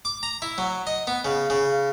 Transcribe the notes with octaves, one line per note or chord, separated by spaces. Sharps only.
D6
A#5
E4
F#3
D#5
B3
C#3
C#3